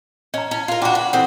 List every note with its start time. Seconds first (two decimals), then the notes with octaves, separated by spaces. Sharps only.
0.34 C#4 D#5 A#5
0.51 C#4 E4
0.68 F4 A#4
0.82 D4 F4 F#4 G5 A#5
0.95 B4
1.13 E3 C4 A4 F#5